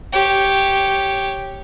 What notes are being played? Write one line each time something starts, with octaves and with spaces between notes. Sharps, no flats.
G4 C#5